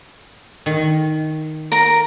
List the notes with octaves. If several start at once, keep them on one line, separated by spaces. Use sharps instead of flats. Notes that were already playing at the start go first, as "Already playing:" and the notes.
D#3
A#4 A#5